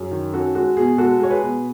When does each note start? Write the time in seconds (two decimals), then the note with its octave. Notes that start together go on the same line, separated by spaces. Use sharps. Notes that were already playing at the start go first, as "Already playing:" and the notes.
Already playing: F#2 G#4
0.12 D#3
0.33 C#4 F#4 A4
0.55 G#3 F#4 A4
0.77 B2 G#4
0.98 G#3 F#4 A4
1.20 G#3 C#5
1.31 G#4 B4
1.42 B2